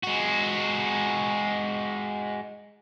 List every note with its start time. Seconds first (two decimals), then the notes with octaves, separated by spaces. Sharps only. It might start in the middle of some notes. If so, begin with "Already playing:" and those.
0.03 G#3 F#4